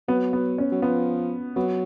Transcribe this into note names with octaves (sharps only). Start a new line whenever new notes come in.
F#3 B3
B3
C#4
F#3
F3 B3
F#3 B3